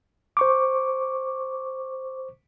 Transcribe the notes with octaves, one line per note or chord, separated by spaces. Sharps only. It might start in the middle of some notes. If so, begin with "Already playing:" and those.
C5 C#6 D6